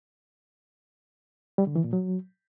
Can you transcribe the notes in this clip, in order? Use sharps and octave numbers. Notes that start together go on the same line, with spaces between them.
G3
D3
E3
A#2
F#3